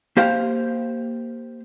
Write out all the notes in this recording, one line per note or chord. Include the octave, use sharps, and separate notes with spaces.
A#3 G4 C5 F5